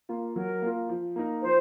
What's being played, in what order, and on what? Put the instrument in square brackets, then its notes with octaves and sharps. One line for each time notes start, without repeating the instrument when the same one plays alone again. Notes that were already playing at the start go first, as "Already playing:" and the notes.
[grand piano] A#3 F4
[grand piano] F#3 [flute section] A#4
[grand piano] A#3 F4
F3
A#3 D#4 A#4
[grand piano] F3 [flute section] C5